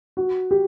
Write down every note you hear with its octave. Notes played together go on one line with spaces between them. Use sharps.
F#4
G4